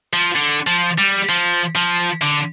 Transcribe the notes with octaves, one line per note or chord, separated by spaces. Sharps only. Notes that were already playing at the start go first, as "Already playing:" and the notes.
F3
D3
F3
G3
F3
F3
D3